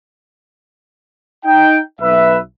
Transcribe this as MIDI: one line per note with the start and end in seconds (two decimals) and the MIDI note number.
1.45 1.80 63
1.45 1.80 79
2.01 2.38 35
2.01 2.38 71
2.01 2.38 76